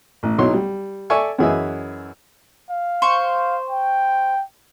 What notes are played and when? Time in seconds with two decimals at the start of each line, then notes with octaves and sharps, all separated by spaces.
0.23 A1
0.38 B1 F#3 D#4 E4 C6
0.54 G3
1.10 A4 D5 E5 G#5 C#6
1.38 F#2 E3 G#4 B4 D#5 E5
2.71 F5
3.02 C5 C#6
3.70 G5